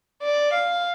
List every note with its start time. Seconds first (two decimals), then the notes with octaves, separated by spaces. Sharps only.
0.22 D5
0.53 F5